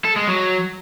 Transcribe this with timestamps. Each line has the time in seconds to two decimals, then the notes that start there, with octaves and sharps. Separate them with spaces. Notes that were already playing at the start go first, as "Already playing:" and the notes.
0.05 A4
0.16 G#3
0.28 F#3